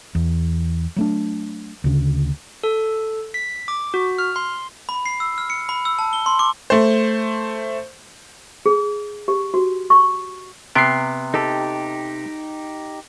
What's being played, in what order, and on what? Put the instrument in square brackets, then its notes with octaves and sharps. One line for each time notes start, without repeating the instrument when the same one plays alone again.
[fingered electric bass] E2
F#3 A3 D4
D2 C#3
[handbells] A4
B6
D6
F#4
F6
C6
[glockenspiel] B5
C7
E6
F6
C#7
B5
E6
A5
G7
C6
D6
[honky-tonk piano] A3 C5
[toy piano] G#4
G4
F#4
C#6
[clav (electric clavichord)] C3 B3 [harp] C7 D7
[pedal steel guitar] D#4 G4 [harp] A4